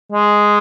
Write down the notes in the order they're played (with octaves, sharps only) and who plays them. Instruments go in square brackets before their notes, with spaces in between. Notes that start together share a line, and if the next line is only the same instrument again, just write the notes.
[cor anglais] G#3